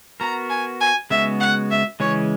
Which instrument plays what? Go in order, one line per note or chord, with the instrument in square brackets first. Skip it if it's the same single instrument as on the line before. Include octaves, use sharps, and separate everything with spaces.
[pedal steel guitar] B3 F#4 A#4 [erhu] A#5
[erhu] G#5
G#5
[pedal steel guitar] C#3 G#3 B3 F#4 [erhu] E5
[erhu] F#5
E5
[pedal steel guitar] C#3 E3 G#3 C#4 [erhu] C#5